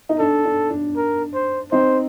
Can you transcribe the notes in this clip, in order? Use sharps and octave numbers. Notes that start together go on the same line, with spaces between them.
D#4
D4 A4
D4
D4
A#4
C5
C4 D#4 C5